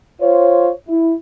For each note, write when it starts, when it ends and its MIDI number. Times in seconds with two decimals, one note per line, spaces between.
0.21 0.71 65
0.21 0.71 72
0.21 0.71 73
0.88 1.13 64